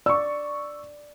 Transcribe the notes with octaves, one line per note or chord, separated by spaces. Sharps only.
D5 C#6 E6